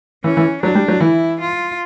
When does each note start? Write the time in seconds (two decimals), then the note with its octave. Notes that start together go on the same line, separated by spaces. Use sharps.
0.23 E3 C#4
0.37 E3
0.62 F#3 D4
0.75 G3
0.88 F#3
1.01 E3 E4
1.40 F4